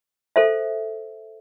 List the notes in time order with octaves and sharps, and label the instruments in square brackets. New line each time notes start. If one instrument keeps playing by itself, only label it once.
[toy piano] A4 C5 E5